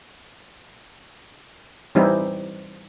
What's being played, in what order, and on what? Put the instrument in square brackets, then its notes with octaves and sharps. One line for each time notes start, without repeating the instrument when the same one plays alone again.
[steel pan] E3 G3 C4 D#4 E4